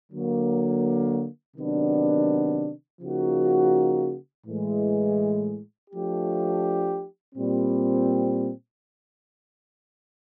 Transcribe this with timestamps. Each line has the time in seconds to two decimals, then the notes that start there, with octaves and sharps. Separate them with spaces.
0.12 D3 F#3 A#3
1.56 C3 D#3 F#3 B3 D4
3.01 C#3 F3 A#3 D#4 F#4
4.45 A2 E3 G#3
5.90 F3 A3 D4 G4
7.35 A#2 G3 C4